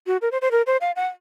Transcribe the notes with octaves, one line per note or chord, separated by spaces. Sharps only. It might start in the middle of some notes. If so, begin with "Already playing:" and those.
F#4
A#4
C5
C5
A#4
C5
F5
F#5